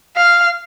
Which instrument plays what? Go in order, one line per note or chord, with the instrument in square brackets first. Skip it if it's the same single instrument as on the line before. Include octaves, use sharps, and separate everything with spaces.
[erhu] F5